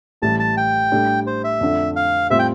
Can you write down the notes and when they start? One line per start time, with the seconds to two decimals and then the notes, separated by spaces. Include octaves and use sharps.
0.22 A1 A2 E3 G3 A5
0.40 A5
0.57 G5
0.92 A2 G3 D4 A4
1.27 C5
1.44 E5
1.61 F2 D3 A3 D4
1.96 F5
2.30 A2 G3 C4 F4 E5
2.39 G5